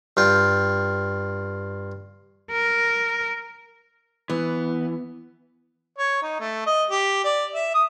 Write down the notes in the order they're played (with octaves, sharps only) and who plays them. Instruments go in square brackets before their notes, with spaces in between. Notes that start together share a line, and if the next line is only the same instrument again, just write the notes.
[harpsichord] G2 F4 G5
[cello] A#4
[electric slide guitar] E3 [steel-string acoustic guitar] B3
[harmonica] C#5
D#4
A3
D#5
G4
D5
E5
D#6